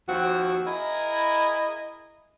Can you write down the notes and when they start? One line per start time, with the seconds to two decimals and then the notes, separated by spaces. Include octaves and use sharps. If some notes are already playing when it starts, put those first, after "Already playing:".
0.08 D#2 F3 C4 F#4
0.67 E4 G#4 A#4 D#5